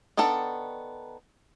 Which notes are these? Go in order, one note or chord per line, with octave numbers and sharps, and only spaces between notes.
D#3 B3 D4 A4 F#5